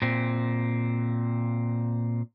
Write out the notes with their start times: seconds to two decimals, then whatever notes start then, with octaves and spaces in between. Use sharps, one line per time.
0.02 A#2 C4